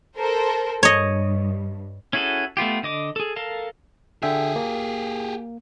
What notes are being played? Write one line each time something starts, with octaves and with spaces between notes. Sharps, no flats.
A4 A#4 C5
G2 C#5 D#5
C#4 E4 F#4 G#4 A4
A3 B3 F4 G4
D3 D#5 D6
G#4 A4
A4 A#4 F5 A5
D3 G4 G#4 E5 G5
A#3